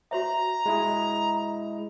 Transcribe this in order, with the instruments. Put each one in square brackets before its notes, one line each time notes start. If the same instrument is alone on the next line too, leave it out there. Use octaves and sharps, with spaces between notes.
[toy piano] F#4 C#5 E5 [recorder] A#5
[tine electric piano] G#3 E4 D#5